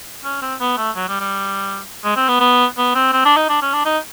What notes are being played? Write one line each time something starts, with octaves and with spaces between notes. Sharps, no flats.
C#4
C4
B3
A3
F#3
G3
G3
G#3
C4
B3
B3
B3
C4
C4
D4
D#4
D4
C#4
D4
D#4